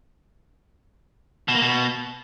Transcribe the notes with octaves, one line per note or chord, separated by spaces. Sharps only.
B2
A#3
B2